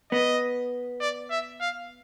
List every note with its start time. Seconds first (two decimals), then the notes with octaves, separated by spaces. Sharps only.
0.12 B3 D#5
1.01 D5
1.31 E5
1.61 F5